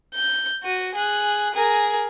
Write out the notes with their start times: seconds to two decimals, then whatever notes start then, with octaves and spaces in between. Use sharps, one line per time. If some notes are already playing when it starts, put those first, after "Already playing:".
0.14 G6
0.63 F#4 D#7
0.95 G#4 F#6
1.54 G#4 A#4